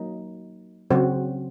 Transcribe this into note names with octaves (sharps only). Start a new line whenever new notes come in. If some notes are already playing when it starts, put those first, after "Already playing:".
Already playing: F#3 A#3 D#4
C#3 F#3 C4 F#4 C5